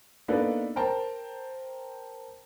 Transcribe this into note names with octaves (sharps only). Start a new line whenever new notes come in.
A#3 B3 D4 D#4 A4 B4
A#4 C5 G5 A5 A#5